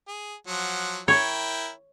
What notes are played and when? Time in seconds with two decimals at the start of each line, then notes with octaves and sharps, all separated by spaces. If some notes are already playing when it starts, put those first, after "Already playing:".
0.08 G#4
0.47 F3 F#3 F#5
1.08 E4 A#4 C#5 G5